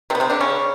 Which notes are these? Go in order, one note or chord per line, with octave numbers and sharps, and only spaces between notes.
C3 C4
B3
C3 C4
D3 D4
C#3 C#4